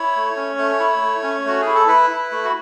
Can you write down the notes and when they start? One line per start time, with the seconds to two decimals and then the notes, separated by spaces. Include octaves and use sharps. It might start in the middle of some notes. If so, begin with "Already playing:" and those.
Already playing: E4 C#5
0.16 A3
0.36 C#4
0.58 A3
0.79 E4
1.01 A3
1.23 C#4
1.45 A3 F#4
1.61 E4 G#4
1.75 A4
1.88 E4 B4
2.10 E4
2.32 A3
2.44 F#4